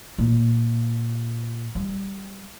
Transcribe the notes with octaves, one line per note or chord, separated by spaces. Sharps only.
A#2
G3